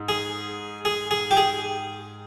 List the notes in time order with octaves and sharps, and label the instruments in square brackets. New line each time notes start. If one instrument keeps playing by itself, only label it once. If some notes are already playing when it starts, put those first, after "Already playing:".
Already playing: [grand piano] G#2
[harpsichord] G#4
G#4
G#4
G4
G#4